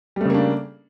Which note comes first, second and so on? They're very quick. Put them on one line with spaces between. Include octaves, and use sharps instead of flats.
G3 A3 C#3 A#3 D4